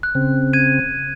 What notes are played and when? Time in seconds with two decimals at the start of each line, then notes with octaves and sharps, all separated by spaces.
0.03 F#6
0.15 C#3 C4
0.53 G#6 D#7